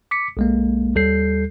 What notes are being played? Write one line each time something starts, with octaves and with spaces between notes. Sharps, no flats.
D6 B6 C#7
B1 G#3 A#3
D#2 G3 A4 G6 C7